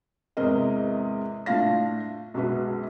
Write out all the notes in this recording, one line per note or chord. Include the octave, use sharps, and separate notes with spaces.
E2 G#2 C3 G#3 A#4 D#5
A2 D4 F4 F5 A#6
B1 F#2 G#3 F#4 B4